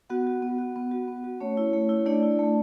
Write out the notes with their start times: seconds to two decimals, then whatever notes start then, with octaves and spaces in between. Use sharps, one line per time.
0.10 B3 F#4 F#5
0.27 F#4
0.42 B3
0.58 F#4
0.76 B3
0.91 F#4
1.08 B3
1.24 F#4
1.40 A3 C#4 C#5
1.57 E4
1.73 A3
1.89 E4
2.06 A3 D4 D5
2.23 E4
2.39 A3